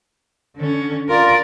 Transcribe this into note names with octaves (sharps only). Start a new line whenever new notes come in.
D3 C#4
F4 A#4 D5